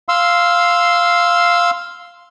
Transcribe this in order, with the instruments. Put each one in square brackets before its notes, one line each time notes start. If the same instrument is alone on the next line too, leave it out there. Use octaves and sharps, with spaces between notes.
[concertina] F5 C6 E6